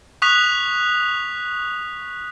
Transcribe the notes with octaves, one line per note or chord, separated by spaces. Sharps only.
C#6 D#6 F#6 B6 F7